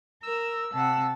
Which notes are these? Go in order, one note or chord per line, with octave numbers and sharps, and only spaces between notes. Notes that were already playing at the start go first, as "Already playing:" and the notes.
A#4 E6
C3 F#5 A5